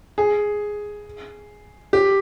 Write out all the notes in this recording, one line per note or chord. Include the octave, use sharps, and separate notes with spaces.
G#4
G4